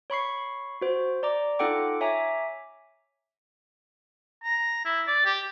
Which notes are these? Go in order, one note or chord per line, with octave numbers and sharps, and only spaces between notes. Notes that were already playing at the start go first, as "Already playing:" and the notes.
C#5 B5 C#6 C7
F#4 C5 G6
D5 A#5 D6
D#4 F4 A4 F#5 G5 D6
C#5 E5 G#5 A#5 D6
A#5
E4
D5
G4